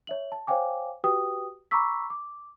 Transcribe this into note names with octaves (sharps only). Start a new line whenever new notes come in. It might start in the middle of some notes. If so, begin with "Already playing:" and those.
C#5 E5 F#7
A5
C5 C#5 F5 G5 G#5 D6
F#4 G4 B4 G5 D#6
A#5 B5 C#6 D6 E6 B6
D6